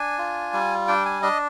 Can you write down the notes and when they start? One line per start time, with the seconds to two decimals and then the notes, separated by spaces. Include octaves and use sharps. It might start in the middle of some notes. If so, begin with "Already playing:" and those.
Already playing: D4 G#5
0.19 F4
0.53 G3
0.88 D4 G5
1.06 G#5
1.22 D4 D#5